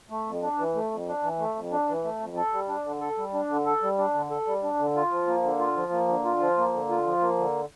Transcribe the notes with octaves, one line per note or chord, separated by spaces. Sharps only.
A3
F2
D4
E3
A3
F2
D4
E3
A3
F2
D4
E3
A3
F2
A4
G3
D4
D3
A4
G3
D4
D3
A4
G3
D4
D3
A4
G3
D4
D3
F4
F3
A#3
D3
F4
F3
A#3
D3
F4
F3
A#3
D3
F4
F3
A#3
D3